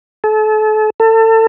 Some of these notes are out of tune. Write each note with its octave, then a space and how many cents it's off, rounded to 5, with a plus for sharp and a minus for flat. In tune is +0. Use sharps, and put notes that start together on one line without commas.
A4 -35
A4 +30